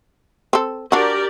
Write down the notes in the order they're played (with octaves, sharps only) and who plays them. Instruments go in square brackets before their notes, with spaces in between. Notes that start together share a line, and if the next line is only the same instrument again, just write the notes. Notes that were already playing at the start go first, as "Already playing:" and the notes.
[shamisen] C4 A4
[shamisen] D4 F#4 [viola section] G4 A#4 D5